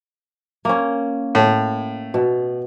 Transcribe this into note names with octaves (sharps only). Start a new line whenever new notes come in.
A#3 C#4
A2
B2